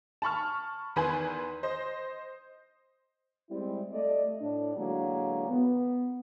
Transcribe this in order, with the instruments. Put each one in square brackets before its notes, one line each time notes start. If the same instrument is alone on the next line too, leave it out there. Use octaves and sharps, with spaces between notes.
[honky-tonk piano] A5 B5 C#6 F6
E2 D#3 B4 G#5 B5 C6
C5 D#5
[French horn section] G3 G#3 C4 E4
A3 D5 D#5
A2 D4
D3 E3 F#3 G#3 A#3 D4
B3